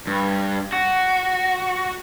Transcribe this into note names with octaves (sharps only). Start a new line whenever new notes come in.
G2
F#4